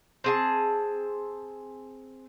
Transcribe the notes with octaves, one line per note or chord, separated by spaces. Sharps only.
C4 G#4 A5